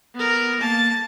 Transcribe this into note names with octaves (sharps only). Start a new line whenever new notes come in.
B3 A#4
A#3 A5